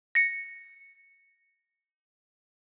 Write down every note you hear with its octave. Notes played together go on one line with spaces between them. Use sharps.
A#6 C#7